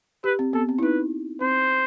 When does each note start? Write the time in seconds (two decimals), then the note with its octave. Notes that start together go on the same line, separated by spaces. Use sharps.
0.24 G4 B4
0.39 C4
0.53 B3 A4
0.69 C4
0.79 E4
0.82 D#4 B4
1.41 C4 C5